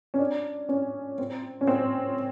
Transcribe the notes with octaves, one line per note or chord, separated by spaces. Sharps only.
C#4
D4
C#4
C4
C#4
C4